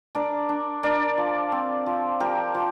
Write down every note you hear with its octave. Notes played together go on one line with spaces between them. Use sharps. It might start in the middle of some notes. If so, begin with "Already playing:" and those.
D4 A#4 D5
D4
D4 A#4 D5
F3
C4
F3
F3 G4 A#4
F3